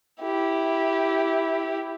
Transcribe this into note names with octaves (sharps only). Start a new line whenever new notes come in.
E4 G4